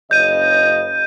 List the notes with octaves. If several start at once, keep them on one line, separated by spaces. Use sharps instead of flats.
F#1 C#3 D#5 G6 D#7